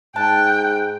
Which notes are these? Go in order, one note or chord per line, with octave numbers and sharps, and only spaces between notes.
G#2 G5 A5 F#6